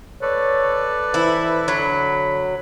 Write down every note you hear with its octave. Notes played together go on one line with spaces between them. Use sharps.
A4 B4 C#5 D5
E3 E4 C5
D3 F#3 B5